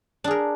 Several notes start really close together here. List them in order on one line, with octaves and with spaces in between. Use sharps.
D4 G#4 A#4